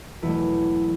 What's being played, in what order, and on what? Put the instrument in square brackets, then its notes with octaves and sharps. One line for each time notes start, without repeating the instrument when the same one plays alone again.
[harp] E2 B2 F#3 A3 E4